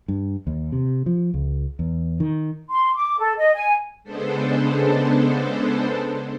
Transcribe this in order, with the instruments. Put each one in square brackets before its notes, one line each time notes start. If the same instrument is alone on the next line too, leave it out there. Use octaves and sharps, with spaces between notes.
[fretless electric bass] G2
D#2
C3
F3
C#2
E2
D#3
[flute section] C6
D6
A4
D#5
G#5
[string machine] C#3 G#3 B3 D4 A4 C5